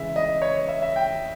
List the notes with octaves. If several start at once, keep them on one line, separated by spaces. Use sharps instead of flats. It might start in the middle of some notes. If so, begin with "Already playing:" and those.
Already playing: C#3 E3 G#3 E5
D#5
C#5
C#5
E5
E5
G5